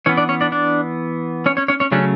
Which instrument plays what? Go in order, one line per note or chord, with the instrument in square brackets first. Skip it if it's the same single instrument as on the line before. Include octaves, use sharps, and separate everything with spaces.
[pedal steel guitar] E3 B3 C#4 C#5
D4 D5
C#4 C#5
D4 D5
D4 D5
C#4 C#5
C#4 C#5
C#4 C#5
C#4 C#5
C#3 F#3 A3 C#4 D4